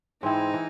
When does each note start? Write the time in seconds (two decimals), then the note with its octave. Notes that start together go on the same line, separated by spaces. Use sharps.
0.23 G#2 E3 C4 D#4 E4
0.54 E3